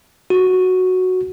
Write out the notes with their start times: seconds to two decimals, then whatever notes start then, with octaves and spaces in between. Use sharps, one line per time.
0.30 F#4